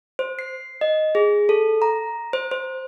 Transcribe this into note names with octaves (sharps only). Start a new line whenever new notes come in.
C5
C7
D#5
G#4
A4
A#5
C5
C5